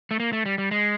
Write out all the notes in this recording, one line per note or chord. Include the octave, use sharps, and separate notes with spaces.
A3
A#3
A3
G3
G3
G#3